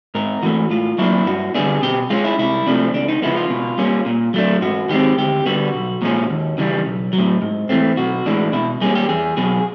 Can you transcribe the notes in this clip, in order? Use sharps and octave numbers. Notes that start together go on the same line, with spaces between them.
G#2 A#4
E3 A3 F#4
A2 F4
F#3 A#3 D4 E4
G2 F#4
D3 G3 B3 D4 G#4
B2 G4
G#3 C#4 F4
E4
C2 E4
C3 F3 A3 D4
C#2 D4
D#4
C#3 F3 G#3 B3 E4
F4
B2
G3 A#3 C#4
A#2
F#3 A3 D4
G#2 F#4
D#3 G#3 C4 G4
D2 G4
D3 G3 B3 F#4
B1
A#2 F3 G#3 C#4
D#2
C#3 E3 G3
B1
A2 F#3
G#2
E3 A3 C4
B1 F#4
A2 E3 G#3 D4
B2 E4
G3 A#3 C#4 G#4
G4
E2 G#4
B2 F#3 G#4